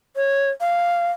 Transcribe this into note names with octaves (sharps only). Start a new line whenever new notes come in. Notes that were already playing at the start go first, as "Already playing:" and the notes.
C#5
F5